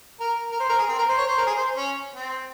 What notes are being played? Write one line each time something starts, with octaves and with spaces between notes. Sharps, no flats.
A#4
A#4
C5
A#4
G#4
C4
A#4
C5
C#5
C5
A#4
G#4
C5
C#4
C4